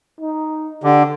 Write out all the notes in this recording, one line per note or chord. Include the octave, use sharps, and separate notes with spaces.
D#4
D3 G4